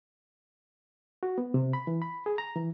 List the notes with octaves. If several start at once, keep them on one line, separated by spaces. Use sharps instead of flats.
F#4
B3
C3
B5
E3
B5
G#4
A#5
E3